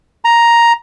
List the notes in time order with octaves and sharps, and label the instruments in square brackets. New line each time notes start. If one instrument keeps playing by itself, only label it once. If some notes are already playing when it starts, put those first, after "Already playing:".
[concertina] A#5